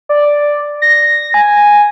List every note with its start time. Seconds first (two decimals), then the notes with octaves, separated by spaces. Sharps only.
0.09 D5
0.82 A#6
1.34 G#5